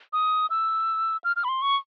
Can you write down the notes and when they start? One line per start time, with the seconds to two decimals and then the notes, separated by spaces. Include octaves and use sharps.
0.13 D#6
0.50 E6
1.24 F6
1.36 F6
1.44 B5
1.48 C6
1.62 C#6